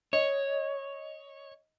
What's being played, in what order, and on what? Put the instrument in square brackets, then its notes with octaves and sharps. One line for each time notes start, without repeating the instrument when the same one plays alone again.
[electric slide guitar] C#5 [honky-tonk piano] D#5